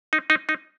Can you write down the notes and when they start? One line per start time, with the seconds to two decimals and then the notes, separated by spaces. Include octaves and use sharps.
0.13 D#4
0.30 D#4
0.49 D#4